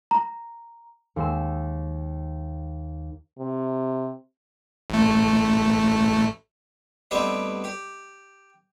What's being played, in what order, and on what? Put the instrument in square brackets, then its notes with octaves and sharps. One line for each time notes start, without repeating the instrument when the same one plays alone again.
[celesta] A#5
[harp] D#2 G#3 C6 E6 E7
[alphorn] C3
[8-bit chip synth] A1 A3
[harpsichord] D2 G3 B3 C4 D#5 E5
G4